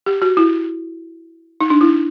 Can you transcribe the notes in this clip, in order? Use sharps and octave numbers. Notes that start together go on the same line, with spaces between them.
G4
F#4
E4
D#4
D4
E4